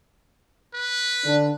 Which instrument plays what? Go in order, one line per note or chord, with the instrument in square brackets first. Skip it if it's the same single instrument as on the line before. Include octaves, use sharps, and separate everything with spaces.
[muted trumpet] B4
[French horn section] D3 D4